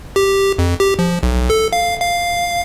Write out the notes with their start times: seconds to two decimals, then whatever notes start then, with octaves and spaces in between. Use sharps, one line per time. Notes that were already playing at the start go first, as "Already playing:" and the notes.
0.16 G4
0.59 F2
0.80 G4
0.99 F3
1.23 B1
1.50 A4
1.73 F5
2.01 F5